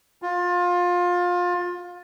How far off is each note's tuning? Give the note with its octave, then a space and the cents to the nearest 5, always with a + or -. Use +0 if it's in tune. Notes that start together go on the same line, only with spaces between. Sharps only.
F4 +25